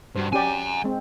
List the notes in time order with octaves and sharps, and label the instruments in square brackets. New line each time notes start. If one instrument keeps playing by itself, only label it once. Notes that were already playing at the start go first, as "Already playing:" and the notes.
[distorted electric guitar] G2 [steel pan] F#4 C5
[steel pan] C#4 G4 D5 [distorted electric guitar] F#5 G#5
[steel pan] G#3 C4